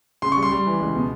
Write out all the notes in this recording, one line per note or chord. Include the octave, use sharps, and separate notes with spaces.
C#3 C6
G3 C#6
C6
G3
E3
C#2
B2